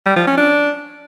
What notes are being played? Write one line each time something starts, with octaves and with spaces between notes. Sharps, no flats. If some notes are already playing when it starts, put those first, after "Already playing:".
G3
F3
C#4
D4